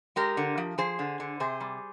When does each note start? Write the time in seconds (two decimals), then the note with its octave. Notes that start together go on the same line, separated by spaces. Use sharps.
0.16 G#3 G4 A#4
0.37 D3
0.58 F3
0.78 F3 G#4 C5
0.99 D3
1.20 D3
1.40 C3 G#4 C5
1.60 G3